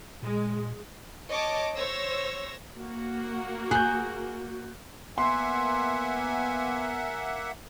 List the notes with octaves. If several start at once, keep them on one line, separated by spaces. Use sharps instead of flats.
A#2 G#3
C#5 D#5 A5 D6
C5 C#5 E6 A#6
A#3 F#4
G#4 F#6 G6
A#3 B3 E5 F#5 G#5 C6